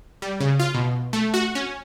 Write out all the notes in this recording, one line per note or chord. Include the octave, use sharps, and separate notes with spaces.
G3
C#3
F4
B2
A3
F#4
C#4